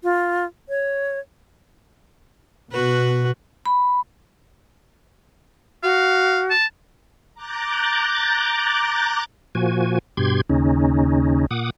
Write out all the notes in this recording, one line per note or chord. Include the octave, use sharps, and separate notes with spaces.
F4
C#5
B2 F#4 B4
B5
F#4 F5
A5
A#5 D6 F#6 G6 A6
A#2 F3 F#4 G#5
G2 B2 G4 C6 G#6
D#2 C#3 C#4 D#4
A#2 F#5 D6 D#6